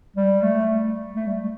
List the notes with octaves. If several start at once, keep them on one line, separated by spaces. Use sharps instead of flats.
G3
A3
A3
G3